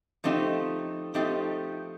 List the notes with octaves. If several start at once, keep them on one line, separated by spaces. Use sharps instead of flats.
F3 A3 C4 D#4 G4
F3 A3 C4 D#4 G4